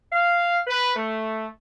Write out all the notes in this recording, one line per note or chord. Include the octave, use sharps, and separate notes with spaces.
F5
B4
A3